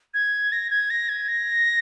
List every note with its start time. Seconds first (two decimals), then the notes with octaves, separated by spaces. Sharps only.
0.14 G#6
0.52 A#6
0.70 G#6
0.90 A#6
1.09 G#6
1.28 A#6